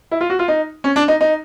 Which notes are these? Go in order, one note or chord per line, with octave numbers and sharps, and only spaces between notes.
E4
F4
F#4
F4
D#4
C#4
D4
D#4
D#4